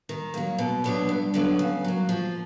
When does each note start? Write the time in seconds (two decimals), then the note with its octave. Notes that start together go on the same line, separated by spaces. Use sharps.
0.09 D#3
0.34 F#3 A#3
0.58 B2
0.84 F#3 B3 D4
1.09 G2
1.34 D3 F#3 B3
1.59 C#3
1.84 F#3 A#3
2.09 F3